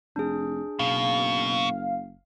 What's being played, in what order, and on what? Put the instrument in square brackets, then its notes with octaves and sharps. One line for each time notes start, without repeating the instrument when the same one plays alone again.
[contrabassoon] F1 [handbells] D4 G#4
[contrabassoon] F#1 [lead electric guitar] B2 [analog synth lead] F5